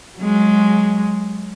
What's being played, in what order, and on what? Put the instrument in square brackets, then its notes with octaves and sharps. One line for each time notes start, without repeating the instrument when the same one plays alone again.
[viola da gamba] F#3 G#3